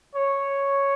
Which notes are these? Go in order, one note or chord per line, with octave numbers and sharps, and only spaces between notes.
C#5